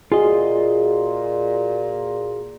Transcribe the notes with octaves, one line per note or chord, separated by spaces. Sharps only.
A#2 F4 F#4 G#4 D#5